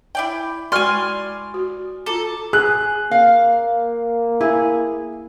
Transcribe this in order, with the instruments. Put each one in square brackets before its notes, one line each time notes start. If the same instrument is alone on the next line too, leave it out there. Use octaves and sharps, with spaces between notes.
[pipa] E4 D5 G5
[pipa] E3 [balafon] G#3 F#4 [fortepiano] D5 C#6 F6 [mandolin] G#5 C6
[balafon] F#4
[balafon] F4 A#5 D6 [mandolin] A4
[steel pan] G#4 [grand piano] F#6
[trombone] A#3 [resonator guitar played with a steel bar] F5
[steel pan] E4 [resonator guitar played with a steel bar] G#4